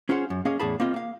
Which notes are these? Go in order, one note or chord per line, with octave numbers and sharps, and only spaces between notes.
C#4 F4 G#4 C5 F5 F#5
F#2
A#3 C#4 G#4 D#5 F5
E2 A2 G#4 A5 B5
A#3 C4 F4 D#5
A#3 F5